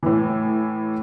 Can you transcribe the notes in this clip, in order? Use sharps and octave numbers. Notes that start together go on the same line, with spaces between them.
A2 E3